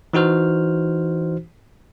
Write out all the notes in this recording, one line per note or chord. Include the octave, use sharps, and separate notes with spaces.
E3 D#4 F#4 C5 F6